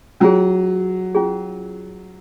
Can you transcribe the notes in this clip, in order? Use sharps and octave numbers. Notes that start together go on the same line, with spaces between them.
F#3 C#4 F4 G#4
C#4 F4 G#4